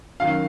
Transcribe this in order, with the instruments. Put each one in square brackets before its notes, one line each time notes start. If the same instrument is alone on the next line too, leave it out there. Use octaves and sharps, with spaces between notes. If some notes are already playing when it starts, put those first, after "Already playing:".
[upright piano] F#2 D#3 F#3 F5